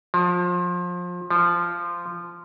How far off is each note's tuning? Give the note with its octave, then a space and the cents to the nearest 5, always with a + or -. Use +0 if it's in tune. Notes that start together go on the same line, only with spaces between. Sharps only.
F3 +25
F3 -15